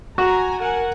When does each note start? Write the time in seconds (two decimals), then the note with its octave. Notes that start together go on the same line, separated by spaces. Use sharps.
0.18 F#4 G#5 A#5
0.60 A#4 F#5 G#5